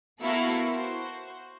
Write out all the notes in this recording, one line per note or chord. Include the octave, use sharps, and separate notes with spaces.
B3 E4 F#4 A4 A#4 F5
F#4 C5